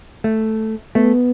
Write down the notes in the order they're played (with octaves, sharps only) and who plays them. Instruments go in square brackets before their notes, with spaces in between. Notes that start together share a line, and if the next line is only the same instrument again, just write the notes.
[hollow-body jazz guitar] A3
[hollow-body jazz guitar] A3 [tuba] B3